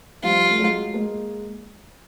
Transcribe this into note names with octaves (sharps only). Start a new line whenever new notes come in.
F3 G3 F4
A3
F#3 G#3
G#3 A#3